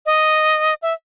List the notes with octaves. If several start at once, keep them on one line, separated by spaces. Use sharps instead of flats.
D#5
E5